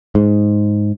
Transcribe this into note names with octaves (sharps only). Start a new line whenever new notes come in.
G#2